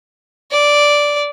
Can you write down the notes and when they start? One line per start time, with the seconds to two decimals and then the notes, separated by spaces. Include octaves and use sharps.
0.51 D5